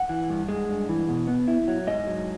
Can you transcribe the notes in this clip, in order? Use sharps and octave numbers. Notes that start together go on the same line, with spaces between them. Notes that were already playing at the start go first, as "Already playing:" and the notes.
Already playing: F#5
E3
G2
G#3
G2
E3
B2
B3
E4
F#3
G#2 D#5
F#3